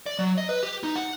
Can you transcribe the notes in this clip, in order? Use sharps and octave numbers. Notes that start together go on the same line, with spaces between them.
D5
F#3
D#5
B4
G4
D#4
F#5